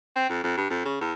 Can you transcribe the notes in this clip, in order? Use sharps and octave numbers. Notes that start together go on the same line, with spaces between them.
C4
F2
F2
G2
F2
C#3
E2